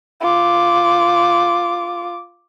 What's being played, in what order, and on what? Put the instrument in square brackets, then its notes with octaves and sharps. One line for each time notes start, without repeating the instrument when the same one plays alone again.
[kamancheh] F4 D6